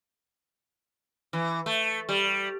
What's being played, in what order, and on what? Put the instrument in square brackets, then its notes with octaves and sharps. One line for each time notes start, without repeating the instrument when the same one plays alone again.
[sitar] E3
A3
G3